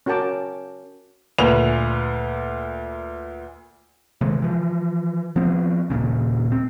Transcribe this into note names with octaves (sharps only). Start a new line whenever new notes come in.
C#4 F#4 A#4 G5 A5 D6
D2 A#2 B4 F#6 F7
C3 D#3 G#3
E3 F3
F3 B3 C4
D#1 A#1 A#2 C#3
C4